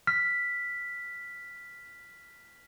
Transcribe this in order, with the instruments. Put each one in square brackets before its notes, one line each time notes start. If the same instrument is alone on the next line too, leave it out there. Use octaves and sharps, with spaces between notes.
[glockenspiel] F6 B6